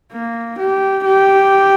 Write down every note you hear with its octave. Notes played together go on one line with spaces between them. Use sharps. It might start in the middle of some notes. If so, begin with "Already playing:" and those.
A#3
G4
G4